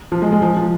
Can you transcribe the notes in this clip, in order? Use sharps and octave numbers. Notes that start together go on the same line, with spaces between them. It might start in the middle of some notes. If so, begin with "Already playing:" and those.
F3
G#3
G#3
F3
F3